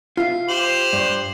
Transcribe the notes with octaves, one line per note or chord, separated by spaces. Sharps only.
F4 E5 C7
G4 C5 F#7
G2